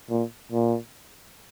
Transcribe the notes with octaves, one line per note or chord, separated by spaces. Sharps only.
A#2
A#2